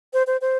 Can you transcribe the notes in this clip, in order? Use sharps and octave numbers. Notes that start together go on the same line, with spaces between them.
C5
C5
C5